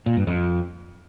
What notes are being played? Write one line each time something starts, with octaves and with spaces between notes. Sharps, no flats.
A#2
G2
F2